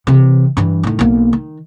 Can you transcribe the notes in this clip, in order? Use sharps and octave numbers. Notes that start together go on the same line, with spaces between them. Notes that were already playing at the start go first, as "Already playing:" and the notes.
C3 E3
G2 E3
A2 D#3
B1 A#3
D#3